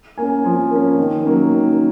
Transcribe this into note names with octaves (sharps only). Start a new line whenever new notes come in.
A#3 C#4 G#5
F3 G#5
A#3 C#4
D#3
F#3 A#3 C#4
D#3